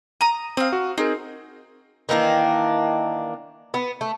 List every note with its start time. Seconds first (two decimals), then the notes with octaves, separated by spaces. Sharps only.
0.21 A#5 D#6 D#7
0.57 C4 F5 D#6
0.73 F#4
0.98 C4 D#4 G#4 A#4
2.09 D#3 E3 A#3 D4
3.74 B3
4.01 A3